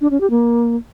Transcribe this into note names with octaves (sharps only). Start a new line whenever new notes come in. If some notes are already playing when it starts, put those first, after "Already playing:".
D4
C#4
G4
A#3